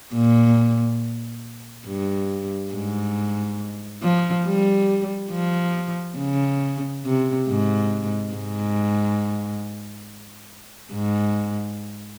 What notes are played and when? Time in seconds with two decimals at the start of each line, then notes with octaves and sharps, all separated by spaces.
0.14 A#2
1.87 G2
2.74 G#2
4.03 F3
4.46 G3
5.32 F3
6.18 C#3
7.05 C3
7.48 G#2
8.34 G#2
10.93 G#2